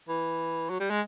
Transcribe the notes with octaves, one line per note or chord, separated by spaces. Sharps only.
E3
F#3
G3
G#3